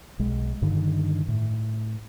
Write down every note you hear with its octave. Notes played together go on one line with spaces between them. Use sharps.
B1 G#3
G2 D3 D#3
A2